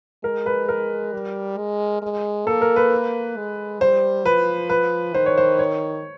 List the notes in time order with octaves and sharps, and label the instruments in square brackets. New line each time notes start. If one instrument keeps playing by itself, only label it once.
[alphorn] G#3 [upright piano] A#4
[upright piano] B4
A#4
[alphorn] G3
G#3
G#3
[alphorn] A#3 [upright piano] A4
[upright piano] A#4
B4
[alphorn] G#3
[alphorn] G3 [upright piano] C5
[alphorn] F3 [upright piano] B4
[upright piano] B4
[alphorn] D#3 [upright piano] C5
[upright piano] C#5
C5
C#5